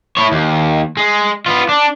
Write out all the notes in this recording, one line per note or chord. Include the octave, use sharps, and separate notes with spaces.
E4 C#5
D#2
G#3
B3 F4
D4